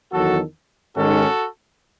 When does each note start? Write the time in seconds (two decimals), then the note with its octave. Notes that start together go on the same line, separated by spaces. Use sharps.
0.12 E2 D#3 F#3 F#4 A4
0.96 G#2 D#3 G#3 C#4 F#4 A4